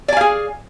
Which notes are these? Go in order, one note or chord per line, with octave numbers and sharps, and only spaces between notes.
G#4 D5 F5 G#5